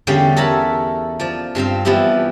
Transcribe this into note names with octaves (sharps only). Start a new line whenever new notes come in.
E2 D3 G3 C#4 F5 G5
A4 A#4 C#5 E5 B5
F3 D5
G2 C4 C5 F5
E3 F3 G3 B3 E4 G4